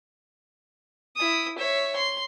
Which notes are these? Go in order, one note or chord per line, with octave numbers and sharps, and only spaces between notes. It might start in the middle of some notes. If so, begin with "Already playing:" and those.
E4 D#6
C#5 E5
C6